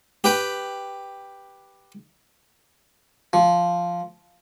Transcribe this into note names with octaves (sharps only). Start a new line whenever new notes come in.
G4 B4 G5
F3